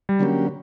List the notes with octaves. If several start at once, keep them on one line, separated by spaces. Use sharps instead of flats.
G3
D3 F#3 A#3 C#4 G4